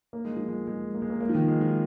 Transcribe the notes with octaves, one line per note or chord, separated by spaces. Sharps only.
A#3
G#3
F3
G#3
G#3
A#3
G#3
A#3
A#3
F3
D#3
G#3
F3